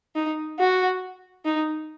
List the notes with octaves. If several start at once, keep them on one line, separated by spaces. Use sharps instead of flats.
D#4
F#4
D#4